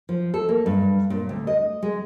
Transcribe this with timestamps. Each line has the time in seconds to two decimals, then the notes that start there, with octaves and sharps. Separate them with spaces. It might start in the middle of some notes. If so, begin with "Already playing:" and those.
0.09 F3
0.34 A4
0.49 A#3
0.66 G2
1.10 A#2
1.29 D2
1.47 D#5
1.83 G#3